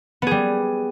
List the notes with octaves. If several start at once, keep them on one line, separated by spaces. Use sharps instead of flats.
G3 B3 G#4